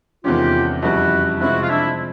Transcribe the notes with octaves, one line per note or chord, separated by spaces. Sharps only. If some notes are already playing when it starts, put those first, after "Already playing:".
E2 C3 D#3 G#3 C#4 F4 G4
F2 C#3 E3 G3 E4 F#4
C3 F3 G#3 C4 E4 F#4
F4
D4 E4